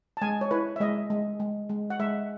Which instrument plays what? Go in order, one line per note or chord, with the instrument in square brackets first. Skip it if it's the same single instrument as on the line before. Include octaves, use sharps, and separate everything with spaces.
[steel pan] A5
G#3 G#5
C#5
E4 B4
E5
G#3 D#5
G#3
G#3
G#3
F#5
G#3 E5